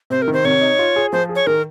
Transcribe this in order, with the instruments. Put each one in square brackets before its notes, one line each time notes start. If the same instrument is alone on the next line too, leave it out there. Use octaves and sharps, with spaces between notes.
[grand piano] C3 [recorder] C5
[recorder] A#4
[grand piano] D#3
[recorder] C5
[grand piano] C3 [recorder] C#5
[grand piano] D#4
F4
G#4
[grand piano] F3 [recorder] C5
[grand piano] G#4
[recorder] C#5
[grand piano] D#3 [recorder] A#4